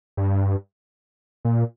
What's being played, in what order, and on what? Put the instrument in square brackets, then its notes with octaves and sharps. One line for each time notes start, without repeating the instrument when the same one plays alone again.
[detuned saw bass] G2
A#2